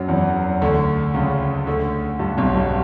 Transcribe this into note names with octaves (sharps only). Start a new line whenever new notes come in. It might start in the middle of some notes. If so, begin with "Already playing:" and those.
Already playing: F#2 F#3
E2 E3
D2 D3
C#2 C#3
D2 D3
G2
B1 B2
G2